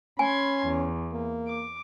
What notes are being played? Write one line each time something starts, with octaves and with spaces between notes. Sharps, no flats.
C#4 G#5 B5 C6 G#6
E2
A#3
D6